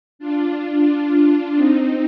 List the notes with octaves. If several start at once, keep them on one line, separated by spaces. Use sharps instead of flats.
D4 F4
D4 F4
C4 D#4